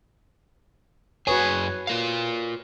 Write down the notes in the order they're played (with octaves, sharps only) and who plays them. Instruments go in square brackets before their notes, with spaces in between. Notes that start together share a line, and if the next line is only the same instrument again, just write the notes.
[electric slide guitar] F#2 G#4 G#5 [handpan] F#4 B4 C#5
[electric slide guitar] F4 A#4 F5